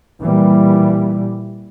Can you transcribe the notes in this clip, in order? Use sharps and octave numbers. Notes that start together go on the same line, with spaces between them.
A#2 E3 G3